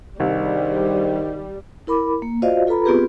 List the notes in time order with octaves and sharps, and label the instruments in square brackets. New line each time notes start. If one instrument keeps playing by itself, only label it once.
[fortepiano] C2 [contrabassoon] D#3 [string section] G3 [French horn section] D4 G#4 C5
[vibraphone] E4 A#4 B5 D6
A#3
F4 F#4 C5 D5 D#5 F5
F4 A4 B4 A#5 B5
B3 C4 F4 G4 G#4 B4